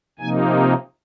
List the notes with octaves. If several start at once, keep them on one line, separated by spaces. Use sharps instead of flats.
C3 F3 A#3 D#4 G#5